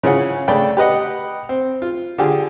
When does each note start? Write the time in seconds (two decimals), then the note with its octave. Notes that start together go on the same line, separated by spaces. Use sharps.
0.03 C#3 E4 F4 G#4 C#5 F#5
0.48 C#3 A3 D4 G5 B5
0.77 G4 B4 D#5 F#5
1.49 C4
1.82 F4
2.18 D3 F4 G4 G#4